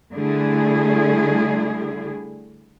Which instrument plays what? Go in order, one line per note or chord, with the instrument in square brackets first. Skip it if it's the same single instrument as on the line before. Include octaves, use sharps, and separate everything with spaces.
[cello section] D3 G3 A3 E4 G#4